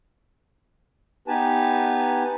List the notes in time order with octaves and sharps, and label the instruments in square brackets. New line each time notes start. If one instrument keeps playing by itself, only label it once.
[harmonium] B3 D#4 G4 B4 G#5 A5